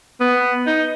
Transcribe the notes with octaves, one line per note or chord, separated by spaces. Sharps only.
B3
D#4